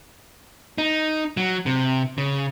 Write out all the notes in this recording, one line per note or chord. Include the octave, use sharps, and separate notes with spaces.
D#4
F#3
C3
C#3